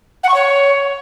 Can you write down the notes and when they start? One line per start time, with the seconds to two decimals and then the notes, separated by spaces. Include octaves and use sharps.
0.23 F#5
0.29 C#6
0.34 C#5